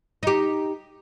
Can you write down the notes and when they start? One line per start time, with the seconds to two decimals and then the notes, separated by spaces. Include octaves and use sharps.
0.23 D#4 G4